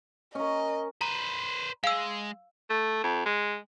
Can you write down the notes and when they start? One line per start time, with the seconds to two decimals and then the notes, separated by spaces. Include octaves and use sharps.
0.35 C#4 A#4 D#5
1.01 B4 C5 A#5
1.84 G#3 F5 E6
2.70 A3
3.04 F2
3.25 G#3